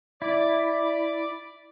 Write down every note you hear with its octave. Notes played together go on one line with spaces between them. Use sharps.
E4 D5